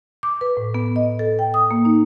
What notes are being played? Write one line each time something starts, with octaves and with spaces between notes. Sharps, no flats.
D6
B4
A2
B3
D#5
A4
G5
D#6
A#3
D#4